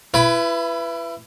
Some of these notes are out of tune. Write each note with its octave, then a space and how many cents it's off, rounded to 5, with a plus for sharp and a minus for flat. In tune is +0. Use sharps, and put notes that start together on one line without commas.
E4 +30 B4 +5